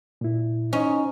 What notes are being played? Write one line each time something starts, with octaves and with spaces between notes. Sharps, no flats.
A#2 E4
C#4 D#4 C5 D#5